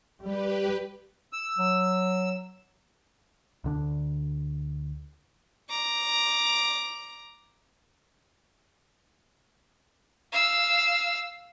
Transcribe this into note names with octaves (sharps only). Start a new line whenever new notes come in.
G3 G4 B4
E6
F#3
D2 D3 D4
A#5 D6
F5 E6